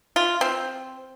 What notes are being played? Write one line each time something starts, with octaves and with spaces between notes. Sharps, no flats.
F4
C4